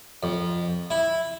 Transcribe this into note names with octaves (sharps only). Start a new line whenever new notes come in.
F2
E4